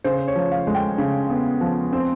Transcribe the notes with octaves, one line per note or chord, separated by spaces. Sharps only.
C#3 C5
C#5
F3
F5
G#3
G5
C#3
B3
F3
C4